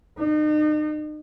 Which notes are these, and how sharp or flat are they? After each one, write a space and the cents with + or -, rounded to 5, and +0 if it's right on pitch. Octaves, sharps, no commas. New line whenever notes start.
D#4 -40